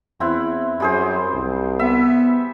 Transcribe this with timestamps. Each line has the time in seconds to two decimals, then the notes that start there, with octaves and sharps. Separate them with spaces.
0.20 E2 C4 E4 F#5
0.80 F#2 G3 G#4 C5
1.33 C2
1.79 B3 E5